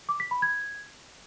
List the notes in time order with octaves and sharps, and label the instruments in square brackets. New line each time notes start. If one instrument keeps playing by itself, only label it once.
[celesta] D6
B6
B5
G#6